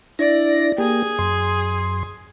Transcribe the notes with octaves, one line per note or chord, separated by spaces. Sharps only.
D4 E4 D5 A#6
A#3 G4 G#4
F#2 C6